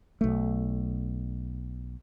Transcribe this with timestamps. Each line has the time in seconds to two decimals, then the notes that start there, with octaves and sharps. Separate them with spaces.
0.21 B1 A3